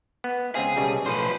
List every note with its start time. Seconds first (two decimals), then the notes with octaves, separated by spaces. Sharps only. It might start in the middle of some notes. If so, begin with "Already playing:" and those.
0.24 B3
0.55 C#2 C4 G#4 F5
0.77 B1 C#3 G3
1.06 B1 A2 F3 B4 C5